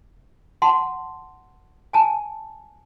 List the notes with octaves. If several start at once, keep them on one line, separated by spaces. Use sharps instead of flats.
F#5 A5 C6
G#5 A5